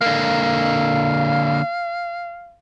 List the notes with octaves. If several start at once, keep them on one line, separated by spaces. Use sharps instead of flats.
D3 A#3 F5